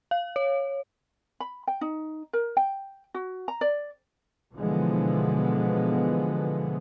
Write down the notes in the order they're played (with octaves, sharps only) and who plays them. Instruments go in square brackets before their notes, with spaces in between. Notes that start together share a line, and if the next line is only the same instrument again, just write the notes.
[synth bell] F5
C#5
[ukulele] B5
G5
D#4
A#4
G5
F#4
A#5
D5
[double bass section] B2 D3 E3 F3 G#3 B3